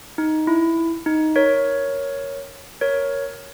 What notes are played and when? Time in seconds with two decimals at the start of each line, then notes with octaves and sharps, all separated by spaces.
0.18 D#4
0.47 E4
1.06 D#4
1.36 A#4 C#5
2.81 A#4 C#5